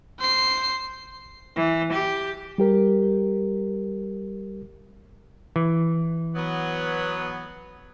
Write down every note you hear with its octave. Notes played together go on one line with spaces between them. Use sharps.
C5 C7
E3
G4
G3 G4 A#4
E3
F#3 B3